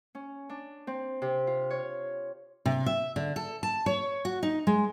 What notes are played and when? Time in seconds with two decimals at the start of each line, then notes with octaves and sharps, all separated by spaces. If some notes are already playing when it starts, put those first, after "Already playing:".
0.15 C#4
0.49 D4
0.87 C4
1.22 C3
1.47 F4
1.70 C#5
2.66 C3
2.86 E5
3.16 D3
3.36 A4
3.63 A5
3.86 C#5
4.25 F#4
4.43 D#4
4.67 G#3